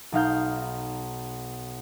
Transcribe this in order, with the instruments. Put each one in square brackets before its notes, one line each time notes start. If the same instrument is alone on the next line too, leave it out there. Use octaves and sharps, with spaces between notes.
[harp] B1 D#4 F5 G6